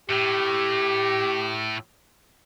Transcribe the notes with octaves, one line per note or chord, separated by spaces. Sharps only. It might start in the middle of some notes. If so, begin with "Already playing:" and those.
A2 G4